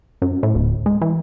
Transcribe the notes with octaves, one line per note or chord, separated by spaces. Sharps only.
F#2
A2
D1
G#3
E3